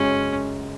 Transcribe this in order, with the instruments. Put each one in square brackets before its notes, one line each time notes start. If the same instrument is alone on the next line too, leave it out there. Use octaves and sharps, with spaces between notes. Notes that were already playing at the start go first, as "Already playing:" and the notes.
Already playing: [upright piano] F#2 C#3 G#3 [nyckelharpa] C#4